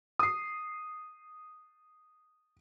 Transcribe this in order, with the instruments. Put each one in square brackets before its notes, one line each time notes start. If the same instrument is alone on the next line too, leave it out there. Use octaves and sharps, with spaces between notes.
[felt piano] D#6 C7